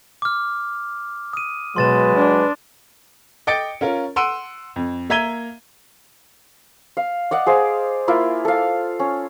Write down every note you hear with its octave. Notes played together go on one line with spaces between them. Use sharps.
D6 F6
D#6 D#7
B2 F#3 G#3 B4 C6 A6 E7
D4
D#5 G5 D6 A6 C#7 D7
C#4 F4 A#4
F#5 C6 E6 D7 D#7
F2
A#3 E5 A#5 G#6 D#7 G7
F5
D5 D#5 F#5
G#4 C5 F5
A#3 E4 F4
A4 F5
C#4